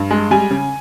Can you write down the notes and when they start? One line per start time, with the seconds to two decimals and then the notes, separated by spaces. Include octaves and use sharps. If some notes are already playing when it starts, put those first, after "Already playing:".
Already playing: G2
0.11 G#3
0.31 G3 G#5
0.51 C#3